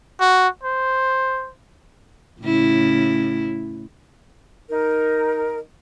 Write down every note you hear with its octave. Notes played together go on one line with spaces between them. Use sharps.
F#4
C5
A2 C#3 E4
D#4 A#4